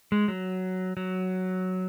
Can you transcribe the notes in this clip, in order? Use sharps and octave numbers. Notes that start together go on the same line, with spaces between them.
G#3
F#3
F#3